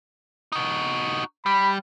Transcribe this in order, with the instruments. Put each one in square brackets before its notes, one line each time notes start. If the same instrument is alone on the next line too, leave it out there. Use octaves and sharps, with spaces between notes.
[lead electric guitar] D#4 F#4
[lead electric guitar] G3 [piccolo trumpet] B5